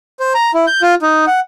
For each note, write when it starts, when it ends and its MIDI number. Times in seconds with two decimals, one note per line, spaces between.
0.20 0.33 72
0.34 0.51 82
0.54 0.66 64
0.67 0.82 91
0.82 0.95 65
1.02 1.25 63
1.27 1.40 78